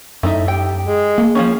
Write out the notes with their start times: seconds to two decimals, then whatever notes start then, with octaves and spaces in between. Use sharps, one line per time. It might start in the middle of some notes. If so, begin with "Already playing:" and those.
0.23 F#2 A2 A3 D#4 E5
0.48 G4 G5
0.85 G#3
1.18 A#3
1.35 F3 F#3 C#4 C#5